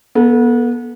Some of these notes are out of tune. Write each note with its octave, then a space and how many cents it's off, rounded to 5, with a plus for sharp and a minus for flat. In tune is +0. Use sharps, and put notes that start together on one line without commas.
B3 -35 A4 +0